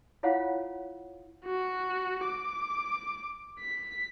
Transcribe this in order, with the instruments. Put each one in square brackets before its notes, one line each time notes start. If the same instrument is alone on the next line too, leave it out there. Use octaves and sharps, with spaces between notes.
[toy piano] E4 F4 C5 C#5 F5 F#5
[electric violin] F#4
D6
B6